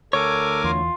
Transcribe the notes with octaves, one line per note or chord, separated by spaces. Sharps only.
D2 A4 A#4 C#5 G#5 D6
E2 F4